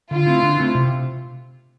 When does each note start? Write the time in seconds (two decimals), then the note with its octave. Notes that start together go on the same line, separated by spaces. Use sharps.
0.10 D3 F4
0.26 A3 C4 E4
0.43 D3
0.59 A3 C4 E4
0.75 C3